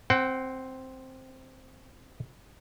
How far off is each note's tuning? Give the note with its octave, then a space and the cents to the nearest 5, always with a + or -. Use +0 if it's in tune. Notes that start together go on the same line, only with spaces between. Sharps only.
C4 +0 F#5 +30